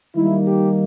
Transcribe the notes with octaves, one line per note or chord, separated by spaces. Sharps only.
D#3 G3 A#3 D#4 E4
G4